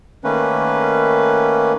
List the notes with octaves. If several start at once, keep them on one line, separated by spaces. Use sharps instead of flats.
D#3 A3 A#3 C#4 B4